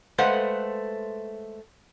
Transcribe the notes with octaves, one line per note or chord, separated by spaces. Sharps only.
G#3 A3 B4 C5 F5 F#5